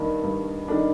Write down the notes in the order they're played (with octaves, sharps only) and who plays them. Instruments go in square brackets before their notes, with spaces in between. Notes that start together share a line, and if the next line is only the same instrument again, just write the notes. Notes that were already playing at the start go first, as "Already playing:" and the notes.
Already playing: [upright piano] G2 D#3 A#3 D4
G2
D#3 A#3 D4